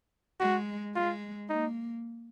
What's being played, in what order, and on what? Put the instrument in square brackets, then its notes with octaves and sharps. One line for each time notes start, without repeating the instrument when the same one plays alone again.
[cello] G#3 [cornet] F#4
[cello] G#3 [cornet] F4
[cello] A#3 [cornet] D#4